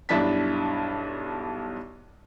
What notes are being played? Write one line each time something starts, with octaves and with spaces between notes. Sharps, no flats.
B1 G2 D4 E4 A5 B6